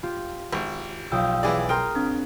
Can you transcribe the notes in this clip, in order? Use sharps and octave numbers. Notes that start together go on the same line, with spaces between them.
F4 G4
G#1
B1 F4 F5 G5 D#6 E6
E3 G#4 D5
G#4 A#4 G5 A#5 C6 D#6 F6
C4 D4